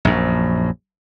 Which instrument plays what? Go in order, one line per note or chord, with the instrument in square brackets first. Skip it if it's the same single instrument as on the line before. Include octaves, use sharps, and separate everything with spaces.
[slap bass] A#1 F#2